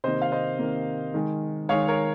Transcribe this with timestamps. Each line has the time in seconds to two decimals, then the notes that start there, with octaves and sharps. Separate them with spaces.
0.04 C3 D#3 A#3 C5 D#5
0.22 F5
0.32 C5 D#5
0.59 C3 D#3 A#3
1.14 D#3 G#3
1.69 D#3 G#3 C#5 F5
1.88 A#4 C#5